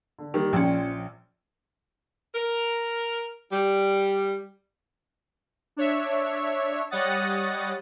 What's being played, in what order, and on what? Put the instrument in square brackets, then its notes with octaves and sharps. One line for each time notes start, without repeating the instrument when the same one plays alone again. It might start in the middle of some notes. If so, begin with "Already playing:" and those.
[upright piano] D3
D#3 G3 A#3
[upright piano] A#1 D5 G5 [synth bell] F3 C#4
[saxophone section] A#4
G3
[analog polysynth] D4 C#5 E5
G3 C#5 D#5 F#5 D#6 A6